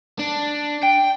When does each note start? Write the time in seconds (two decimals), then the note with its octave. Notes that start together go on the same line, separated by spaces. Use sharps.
0.19 D4
0.83 G5